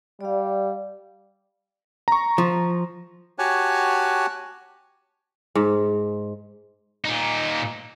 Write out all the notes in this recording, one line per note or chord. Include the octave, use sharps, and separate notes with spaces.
G3 D5 F5
A#5 C#6
F3
F#4 G4 C#5 G#5 A5 F#6
G#2
A#2 D#4